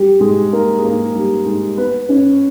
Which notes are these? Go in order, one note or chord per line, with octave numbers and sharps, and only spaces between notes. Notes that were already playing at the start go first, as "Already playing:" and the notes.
Already playing: G3 G4
G#3 G#4
A#3 A#4
G#4
A#3 A#4
G3 G4
G#3 G#4
B3 B4
C#4 C#5